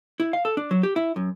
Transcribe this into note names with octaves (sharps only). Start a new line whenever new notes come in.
E4
F5
A4
D4
F#3
G4
E4
F#2